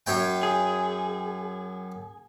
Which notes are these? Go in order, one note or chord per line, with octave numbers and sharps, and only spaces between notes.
F#2 C#5 G5
G#4